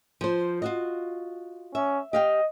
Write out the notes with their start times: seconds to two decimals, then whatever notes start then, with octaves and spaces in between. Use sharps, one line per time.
0.21 F3 C5
0.62 F4 F#4 D#5
1.75 C#4 E5
2.13 G4 D#5 F5 G5